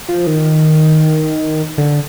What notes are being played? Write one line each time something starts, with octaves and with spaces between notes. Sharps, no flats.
F3
D#3
D3